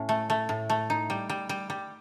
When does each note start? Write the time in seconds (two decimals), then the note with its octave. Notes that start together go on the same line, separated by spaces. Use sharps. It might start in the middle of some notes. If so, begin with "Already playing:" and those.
Already playing: A2 C#4
0.09 A3
0.30 A3
0.49 A2
0.70 A3
0.90 D#4
1.10 G3
1.29 G3
1.49 G3
1.70 G3